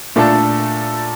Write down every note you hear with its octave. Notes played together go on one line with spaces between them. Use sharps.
A#2 A3 D4 A4